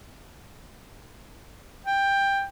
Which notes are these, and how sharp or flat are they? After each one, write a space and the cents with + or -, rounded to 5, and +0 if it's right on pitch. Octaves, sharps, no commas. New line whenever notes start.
G5 +10